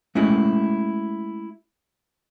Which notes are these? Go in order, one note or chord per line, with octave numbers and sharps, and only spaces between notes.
G#3 A3 C#4 E4 F#4